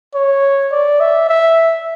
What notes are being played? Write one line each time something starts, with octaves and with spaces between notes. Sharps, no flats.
C#5
D5
E5
E5